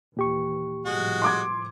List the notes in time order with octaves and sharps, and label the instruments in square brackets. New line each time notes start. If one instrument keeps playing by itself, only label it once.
[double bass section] D#2 E3 [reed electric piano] A#2 G4 C#6
[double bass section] C2 A2 F3 [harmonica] G#3 F#4
[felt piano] C6 D6 G#6